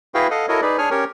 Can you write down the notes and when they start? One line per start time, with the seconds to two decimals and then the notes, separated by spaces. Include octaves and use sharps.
0.14 E4 F#4 G#4 B4 F5 G5
0.31 A4 D#5 F5 F#5
0.49 E4 F#4 A4 A#4 C#5 D#5
0.62 D#4 G#4 B4 D5
0.78 D4 G#4 C#5 G#5 F6
0.91 C#4 G4 A#4 C#5